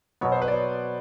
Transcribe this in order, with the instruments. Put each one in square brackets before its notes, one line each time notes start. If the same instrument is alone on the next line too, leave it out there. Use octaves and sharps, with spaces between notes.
[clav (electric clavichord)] B2 F#3 B3 [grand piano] C#5
[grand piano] C5
B4
D5
C#5